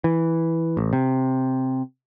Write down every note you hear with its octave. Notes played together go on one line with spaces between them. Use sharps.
E3
A1
C3